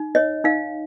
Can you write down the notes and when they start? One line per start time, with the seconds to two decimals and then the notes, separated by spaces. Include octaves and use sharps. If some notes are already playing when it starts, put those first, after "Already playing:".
Already playing: D#4
0.15 C#5 D#5
0.44 D#4 F5